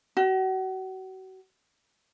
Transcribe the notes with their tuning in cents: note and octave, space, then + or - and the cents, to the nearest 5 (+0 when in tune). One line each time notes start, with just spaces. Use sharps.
F#4 +35